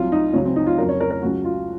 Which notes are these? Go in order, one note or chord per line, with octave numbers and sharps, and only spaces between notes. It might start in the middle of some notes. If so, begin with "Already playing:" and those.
Already playing: C2 C3 F#3 F4
D#4
C#2 C#3 F#3 C#4
C4
D#4
F4
F2 C#3 F#3 A#4
C#5
A#4
A#4
C#2 C#3 F#3 F#4
F4